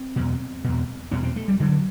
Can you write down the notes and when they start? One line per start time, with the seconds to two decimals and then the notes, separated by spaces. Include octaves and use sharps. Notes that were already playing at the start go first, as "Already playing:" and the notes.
Already playing: C4
0.16 E2 B2
0.64 E2 B2
1.11 E2 B2 C#4
1.23 C4
1.36 A3
1.48 G3
1.60 G2 D3 F#3